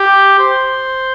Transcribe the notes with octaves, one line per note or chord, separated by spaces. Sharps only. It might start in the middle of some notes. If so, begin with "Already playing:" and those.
Already playing: G4
C5